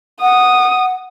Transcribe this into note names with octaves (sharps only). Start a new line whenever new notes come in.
F#5 D#6